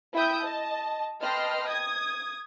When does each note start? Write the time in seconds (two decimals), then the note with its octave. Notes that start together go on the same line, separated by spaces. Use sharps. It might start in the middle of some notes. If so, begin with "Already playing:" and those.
0.14 E4 E5 G5 D#6 G6
0.43 D#5 A5
1.21 B4 D#5 G5 A5 C6 F6
1.68 D#6 G#6